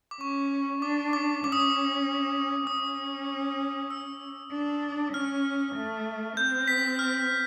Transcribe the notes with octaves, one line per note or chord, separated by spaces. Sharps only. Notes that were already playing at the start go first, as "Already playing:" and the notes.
D6
C#4 C#6
D4 D6
D6
C#4 D6
D#6
D6
C#4 D#6
E6
D4
C#4 F6
A3
C4 G6
B6
F6